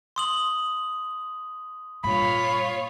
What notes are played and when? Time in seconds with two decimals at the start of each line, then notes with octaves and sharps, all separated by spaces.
0.16 C6 D#6 F#7
2.04 G2 A#2 F4 C#5 F5 B5